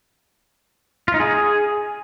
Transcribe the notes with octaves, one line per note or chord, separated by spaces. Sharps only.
F4
D#4
G#4